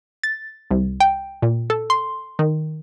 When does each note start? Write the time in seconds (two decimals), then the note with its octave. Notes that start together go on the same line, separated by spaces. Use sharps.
0.24 A6
0.71 C2
1.00 G5
1.42 A#2
1.70 A4
1.90 C6
2.39 D#3